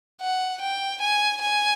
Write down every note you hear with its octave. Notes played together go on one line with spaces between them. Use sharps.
F#5
G5
G#5
G#5